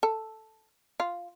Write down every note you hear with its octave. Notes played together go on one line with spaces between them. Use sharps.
A4
F4